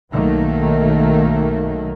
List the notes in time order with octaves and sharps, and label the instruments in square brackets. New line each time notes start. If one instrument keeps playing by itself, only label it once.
[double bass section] B1 D#3 F#3 A3 A#3